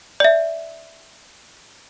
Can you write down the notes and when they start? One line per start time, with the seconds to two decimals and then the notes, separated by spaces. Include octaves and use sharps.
0.20 D5 E5